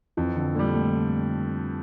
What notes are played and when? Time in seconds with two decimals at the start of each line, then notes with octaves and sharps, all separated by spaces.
0.17 F2 E3
0.36 D3
0.55 A#2 D3 G3
0.74 A3